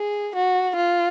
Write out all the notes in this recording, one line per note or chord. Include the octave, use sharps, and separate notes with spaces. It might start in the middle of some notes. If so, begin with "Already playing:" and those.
Already playing: G#4
F#4
F4